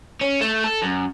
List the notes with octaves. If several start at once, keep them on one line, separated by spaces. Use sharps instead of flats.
C#4
A3
A4
F#2